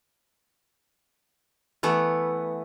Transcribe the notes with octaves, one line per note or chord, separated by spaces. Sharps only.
E3 A3 B3